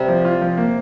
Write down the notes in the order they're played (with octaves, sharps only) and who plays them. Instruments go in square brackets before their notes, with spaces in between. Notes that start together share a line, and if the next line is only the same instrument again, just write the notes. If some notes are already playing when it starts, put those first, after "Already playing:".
Already playing: [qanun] C3 G3
[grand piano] F3
F4
F3
A#3